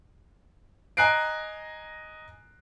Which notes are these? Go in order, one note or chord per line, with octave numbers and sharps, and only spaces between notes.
D#5 G#5 A#5 F#6 C7 D7